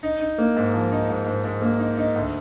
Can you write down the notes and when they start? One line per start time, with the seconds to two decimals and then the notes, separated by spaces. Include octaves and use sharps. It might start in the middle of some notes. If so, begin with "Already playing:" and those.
0.03 D#4
0.21 D#4
0.38 A#3
0.56 G#2
0.74 F3
0.92 D#4
1.09 G#2
1.27 G#2
1.44 G#2
1.62 A#3
1.79 D#4
1.98 D#4
2.16 D2